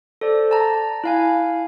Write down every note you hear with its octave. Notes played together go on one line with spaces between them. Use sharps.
A4 C5 D5
A5 A#5
E4 F5 G#5